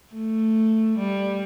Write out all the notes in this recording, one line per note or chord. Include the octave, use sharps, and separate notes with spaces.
A3
G3